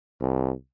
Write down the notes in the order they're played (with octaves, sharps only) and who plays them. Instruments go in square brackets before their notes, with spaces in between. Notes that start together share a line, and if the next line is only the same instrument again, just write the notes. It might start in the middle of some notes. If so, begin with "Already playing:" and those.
[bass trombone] C2